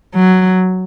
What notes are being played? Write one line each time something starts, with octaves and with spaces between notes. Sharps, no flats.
F#3